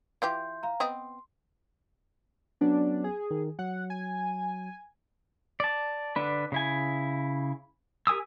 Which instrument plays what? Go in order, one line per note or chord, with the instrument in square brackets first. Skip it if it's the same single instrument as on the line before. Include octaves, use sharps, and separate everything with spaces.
[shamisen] E3 F4 G4 [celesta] E5 C6 G6
[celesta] F5 A#5
[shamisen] B3 C4 D#5 [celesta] C6
[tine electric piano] F#3 B3 C#4 [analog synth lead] D4
[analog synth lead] G#4
[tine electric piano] D#3
[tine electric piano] F#3 [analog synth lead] F#5
[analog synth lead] G#5
[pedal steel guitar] D5 A5
D3 D4 B4
C#3 E4 G#5
G4 A#4 G#5 D#6 E6